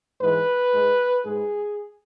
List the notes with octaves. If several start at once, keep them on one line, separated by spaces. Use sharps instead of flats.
G#2 E3 G#3 B4
G#2 G#3
G#2 G#3 G#4